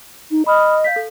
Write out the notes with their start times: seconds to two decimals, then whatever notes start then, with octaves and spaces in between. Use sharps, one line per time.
0.31 D#4
0.46 D#5 B5 D#6 F6
0.84 F5 G6 B6
0.96 A4